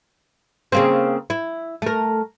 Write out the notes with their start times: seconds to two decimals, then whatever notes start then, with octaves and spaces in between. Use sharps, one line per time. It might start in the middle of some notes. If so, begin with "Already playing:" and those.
0.72 C#3 A#3 C4
1.30 E4
1.82 A3 A#4